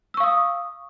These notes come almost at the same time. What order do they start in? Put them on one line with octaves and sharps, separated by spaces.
E6 C#6 F5 D#6